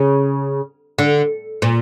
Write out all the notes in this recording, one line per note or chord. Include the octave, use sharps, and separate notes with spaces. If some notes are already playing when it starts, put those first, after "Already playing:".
Already playing: C#3
D3
A#2